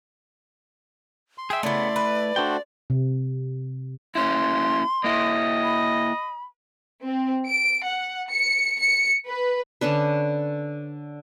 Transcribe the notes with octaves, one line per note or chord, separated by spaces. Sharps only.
C6
G#4 E5 G5
C#3 A3 B3 E4 D5
B4
A3 D4 F#4 C5 G5
C3
A#3 C#4 E4 C6
A#3 E4 D#5
B5
C4
D7
F#5
C#7
C#7
B4
D3 C#4 D4 B4